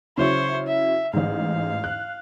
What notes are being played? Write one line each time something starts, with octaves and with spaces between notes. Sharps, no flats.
C#3 F#3 E4 C5 C#5
E5
A1 G#2 F5
F#6